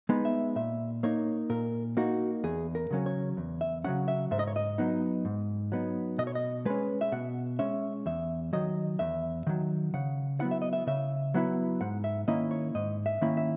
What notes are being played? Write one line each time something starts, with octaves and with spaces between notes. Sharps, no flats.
G#3 B3 D#4
E5
A#2 E5
A#3 D#4 C#5
A#2 A#4
A#3 D#4 F#4
E2 G#4
A#4
C#3 F#3 C#4
C#5
E2
E5
C#3 F#3 C#4 F#5
E5
G#2 E5
D#5
C#5
D#5
F#3 B3 D#4
G#2
F#3 B3 D#4
B2 D#5
C#5
D#5
G#3 C#4 B4
E5
B2 F#5
G#3 C#4 E5
E2 E5
D#3 F#3 D#5
E2 E5
D#3 F#3
C#3 F#5
F#3 B3 E4 F#5
E5
D#5
E5
C#3 E5
F#3 B3 E4
G#2 F#5
E5
D#3 A#3 C#4 E4 D#5
C#5
G#2 D#5
E5
D#3 A#3 C#4 E4
E5